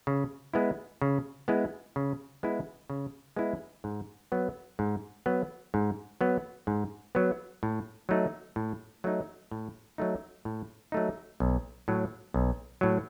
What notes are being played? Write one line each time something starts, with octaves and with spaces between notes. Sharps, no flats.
C#3
G#3 B3 E4
C#3
G#3 B3 E4
C#3
G#3 B3 E4
C#3
G#3 B3 E4
G#2
F#3 B3
G#2
F#3 B3
G#2
F#3 B3
G#2
F#3 B3
A2
F#3 A3 D#4
A2
F#3 A3 D#4
A2
F#3 A3 D#4
A2
F#3 A3 D#4
B1
A2 F#3
B1
A2 F#3